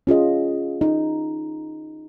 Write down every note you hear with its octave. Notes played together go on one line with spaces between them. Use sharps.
C#4 F4 G#4 D#5
D#4